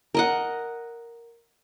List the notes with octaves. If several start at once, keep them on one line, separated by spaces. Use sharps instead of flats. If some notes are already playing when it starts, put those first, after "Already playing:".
A#4 D#5 F#5